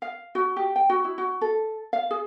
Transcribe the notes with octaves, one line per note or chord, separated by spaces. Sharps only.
F5
F#4
G4
G5
F#4
E4
F#4
A4
F5
G#4